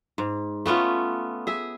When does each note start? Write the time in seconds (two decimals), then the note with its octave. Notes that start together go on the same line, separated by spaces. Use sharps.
0.18 G#2
0.66 A3 B3 C#4 F4
1.47 G#4 E5